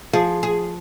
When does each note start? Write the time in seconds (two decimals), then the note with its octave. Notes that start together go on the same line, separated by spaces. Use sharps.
0.13 F3 G#4
0.43 G#4